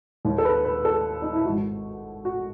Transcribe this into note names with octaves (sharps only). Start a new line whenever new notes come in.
D#2 D#3
A4
B4
B4
A4
D#4
E4
G#1 G#2 D#3 F#4
F#4